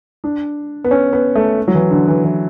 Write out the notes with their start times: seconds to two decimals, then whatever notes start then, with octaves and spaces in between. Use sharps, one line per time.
0.24 D4
0.84 B3
0.91 C#4
1.13 B3
1.35 A3
1.68 F#3
1.74 E3
1.91 D3
2.08 E3
2.24 E3